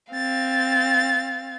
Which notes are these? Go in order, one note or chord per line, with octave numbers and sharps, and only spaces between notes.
C4 F5 A6